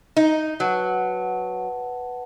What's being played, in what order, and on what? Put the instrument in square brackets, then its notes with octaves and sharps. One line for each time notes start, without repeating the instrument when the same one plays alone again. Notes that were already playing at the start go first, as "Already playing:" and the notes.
[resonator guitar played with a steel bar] D#4
[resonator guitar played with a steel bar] F#3 [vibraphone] B4 F#5 A5